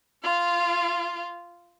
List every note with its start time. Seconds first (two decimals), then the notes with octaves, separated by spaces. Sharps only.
0.24 F4 F5